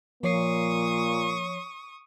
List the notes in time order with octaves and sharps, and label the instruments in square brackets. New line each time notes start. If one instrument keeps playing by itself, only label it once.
[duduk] A#2 [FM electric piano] F3 C#5 C7 [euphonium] A#3 [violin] C#6 D#6